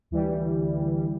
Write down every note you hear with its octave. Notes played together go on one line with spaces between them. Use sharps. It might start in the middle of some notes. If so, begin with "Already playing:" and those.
D2 E3 G3